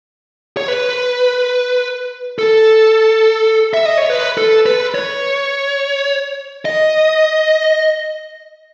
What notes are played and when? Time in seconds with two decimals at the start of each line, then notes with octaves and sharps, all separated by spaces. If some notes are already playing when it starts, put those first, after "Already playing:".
0.57 C#5
0.68 B4
2.39 A4
3.74 E5
3.85 D#5
3.98 C#5
4.10 B4
4.38 A4
4.66 B4
4.95 C#5
6.65 D#5